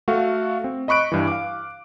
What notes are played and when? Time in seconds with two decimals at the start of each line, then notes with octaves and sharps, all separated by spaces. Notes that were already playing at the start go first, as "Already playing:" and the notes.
0.08 A3 F#4 A4 F5
0.64 C4
0.88 D#5 B5 C#6 F#6 D7
1.12 G2 E3
1.27 F5 D6